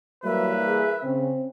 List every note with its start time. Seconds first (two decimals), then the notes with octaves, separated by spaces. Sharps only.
0.24 E3 F#3 G3 A#3 B4 E5
0.68 G#4
1.03 C#3 C4